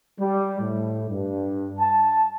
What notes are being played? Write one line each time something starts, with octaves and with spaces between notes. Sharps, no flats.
G3
A2
G2
A5